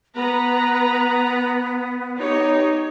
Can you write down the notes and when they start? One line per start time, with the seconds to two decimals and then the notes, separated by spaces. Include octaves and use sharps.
0.15 B3 B4 A#5
2.17 D#4 G4 C#5